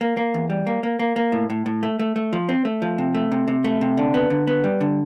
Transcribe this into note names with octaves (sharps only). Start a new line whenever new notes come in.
A#3
A#3
E2
G3
A#3
A#3
A#3
A#3
A2
A2
A2
A3
A3
A3
F3
C4
A3
F3
C3
A3
C3
C3
A3
C3
D3
B3
D3
B3
G3
D3